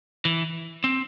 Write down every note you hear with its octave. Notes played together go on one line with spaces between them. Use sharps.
E3
C4